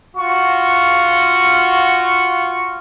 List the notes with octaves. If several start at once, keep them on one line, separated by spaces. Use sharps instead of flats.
F4 F#4 C#6